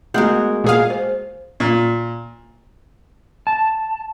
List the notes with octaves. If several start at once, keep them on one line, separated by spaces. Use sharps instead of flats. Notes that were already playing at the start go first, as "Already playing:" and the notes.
G#3 A3 B3 F#4 A#4 E5
A#2 G#4 F5
C5
A#2
A5